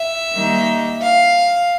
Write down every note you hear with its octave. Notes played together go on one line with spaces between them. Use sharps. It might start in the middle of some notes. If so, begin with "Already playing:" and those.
Already playing: E5
D#3 G3 A#3 D#4
F5